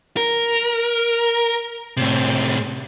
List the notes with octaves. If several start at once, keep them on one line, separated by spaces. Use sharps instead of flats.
A#4
A2 C3